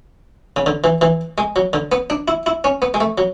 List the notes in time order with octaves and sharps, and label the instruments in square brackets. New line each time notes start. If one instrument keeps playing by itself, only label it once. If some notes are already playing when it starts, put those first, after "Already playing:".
[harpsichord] C#3
D3
E3
E3
G#3
F#3
D3
B3
D4
E4
E4
C#4
B3
G#3
A3
F#3